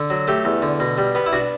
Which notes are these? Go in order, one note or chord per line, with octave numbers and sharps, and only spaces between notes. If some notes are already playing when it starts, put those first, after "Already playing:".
Already playing: D3
F#3
A3 G4
E2
D3
B2
G3
B3
E4
D4 F#4